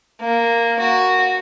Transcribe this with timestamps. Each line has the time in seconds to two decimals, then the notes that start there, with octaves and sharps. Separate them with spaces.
0.21 A#3
0.79 F#4